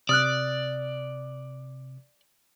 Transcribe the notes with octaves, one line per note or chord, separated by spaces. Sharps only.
C3 D5 D#6 F6 F#6